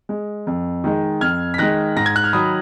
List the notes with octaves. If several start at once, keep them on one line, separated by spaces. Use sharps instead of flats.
G#3
F2
D#3 G#3
F2 F6 G#6
B6
D#3 G#3 F#6 A#6
G#2 A#6
G#6
F#6
F6
D#3 F#3 B5 D#6